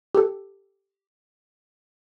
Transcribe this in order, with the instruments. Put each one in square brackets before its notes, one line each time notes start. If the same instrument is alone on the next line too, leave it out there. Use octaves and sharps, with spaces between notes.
[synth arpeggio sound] G4 A4